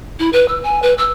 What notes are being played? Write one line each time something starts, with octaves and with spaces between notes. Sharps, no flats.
E4
B4
E6
G#5
B4
E6